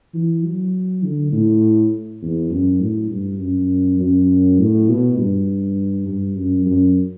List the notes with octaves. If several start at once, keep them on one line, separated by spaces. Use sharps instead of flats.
E3
F#3
D3
A2
E2
F#2
A2
G2
F#2
F#2
A2
B2
G2
G2
F#2
F#2